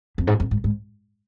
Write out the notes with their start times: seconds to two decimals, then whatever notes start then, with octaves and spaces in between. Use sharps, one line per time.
0.18 F2
0.27 G#2
0.40 F2
0.51 G#2
0.64 G#2